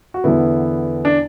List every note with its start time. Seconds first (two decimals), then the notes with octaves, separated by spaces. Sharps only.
0.14 F#4
0.24 E2 D3 B3 E4
1.05 D4